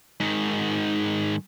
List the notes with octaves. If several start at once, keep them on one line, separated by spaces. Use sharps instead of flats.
G#2 D#3